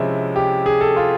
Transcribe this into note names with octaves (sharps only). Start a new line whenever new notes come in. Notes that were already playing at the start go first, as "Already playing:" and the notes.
Already playing: C3 F3 G#3 C#4 E4
G4
G#4
A4
F4